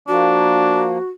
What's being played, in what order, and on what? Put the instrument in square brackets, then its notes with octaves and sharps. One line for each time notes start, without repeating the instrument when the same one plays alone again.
[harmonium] F3 A#3 [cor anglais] D4 [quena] F#4